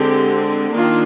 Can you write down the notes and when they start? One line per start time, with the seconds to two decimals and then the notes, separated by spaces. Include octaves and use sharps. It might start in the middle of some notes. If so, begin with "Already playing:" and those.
Already playing: D3 G#3 C4 G4
0.72 D#3 A#3 D4 F4